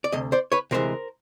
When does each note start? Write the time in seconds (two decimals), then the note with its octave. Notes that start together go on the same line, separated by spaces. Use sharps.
0.04 D5
0.12 D2 C3 D#5
0.32 C5 D5
0.52 B4 C#5
0.71 D2 C3 E3 G#3 A#4 C5